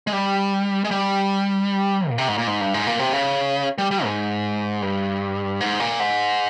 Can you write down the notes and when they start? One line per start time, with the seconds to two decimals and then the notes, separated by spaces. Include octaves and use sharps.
0.07 G#3
0.13 G3
0.84 G#3
0.91 G3
2.10 A#2
2.18 C3
2.28 G#2
2.38 A#2
2.47 G#2
2.61 G2
2.74 G#2
2.87 A#2
2.99 C3
3.13 C#3
3.78 G3
3.91 G3
4.04 G#2
4.82 G2
5.60 G#2
5.80 A#2
6.00 G#2